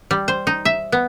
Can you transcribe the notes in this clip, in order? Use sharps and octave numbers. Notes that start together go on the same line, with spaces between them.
G3
C5
D#4
E5
B3